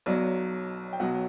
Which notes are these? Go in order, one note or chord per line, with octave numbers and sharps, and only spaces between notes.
B1 B2 F#3 D5
G5
B1 B2 F#3 F#5